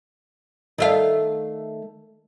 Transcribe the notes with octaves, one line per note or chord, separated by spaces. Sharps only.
D#3 A3 F5